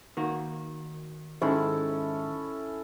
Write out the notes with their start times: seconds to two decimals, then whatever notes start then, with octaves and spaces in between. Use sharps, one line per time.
0.17 D#3 A#3 F#4
1.41 G#2 D#3 G#3 C#4 E4 A4